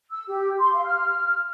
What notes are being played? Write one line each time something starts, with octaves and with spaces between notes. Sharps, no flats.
E6
G4
C6
F5
F6